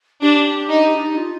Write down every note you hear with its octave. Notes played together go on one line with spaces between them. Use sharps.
D4 G4
D#4
D4
D#4
F4